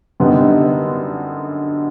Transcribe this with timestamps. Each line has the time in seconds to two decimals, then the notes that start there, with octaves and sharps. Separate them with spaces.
0.20 F#2 D3 G3 B3 D#4